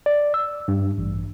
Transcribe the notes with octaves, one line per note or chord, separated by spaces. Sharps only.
D5
E6
G2
A1